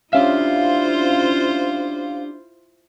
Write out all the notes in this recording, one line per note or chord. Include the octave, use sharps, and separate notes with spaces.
C#4 D4 E4 F4 G4 C5 E5 F5